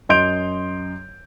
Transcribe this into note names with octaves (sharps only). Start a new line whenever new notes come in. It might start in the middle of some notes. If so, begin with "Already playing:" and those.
F#2 D#5 C6 G6 D7 F7